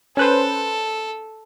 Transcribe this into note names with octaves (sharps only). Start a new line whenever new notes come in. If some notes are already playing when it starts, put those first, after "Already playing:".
C#4 A4 B4 C5